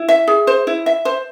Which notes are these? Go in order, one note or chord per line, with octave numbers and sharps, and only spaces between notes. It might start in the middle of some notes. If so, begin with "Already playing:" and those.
Already playing: E4
E5
G#4
C5
E4
E5
C5